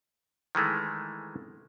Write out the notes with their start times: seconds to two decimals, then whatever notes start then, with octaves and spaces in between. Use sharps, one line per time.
0.55 D#3 E3 G#3 A3